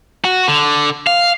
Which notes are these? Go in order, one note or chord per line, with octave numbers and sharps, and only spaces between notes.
F#4
D3
F5